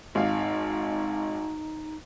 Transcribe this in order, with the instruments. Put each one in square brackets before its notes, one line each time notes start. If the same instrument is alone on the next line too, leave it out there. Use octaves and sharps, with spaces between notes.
[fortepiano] G#1 F5 [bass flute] D#4